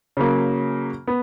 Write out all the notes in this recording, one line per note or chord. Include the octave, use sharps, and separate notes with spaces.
C#3 F#3 A#3
B3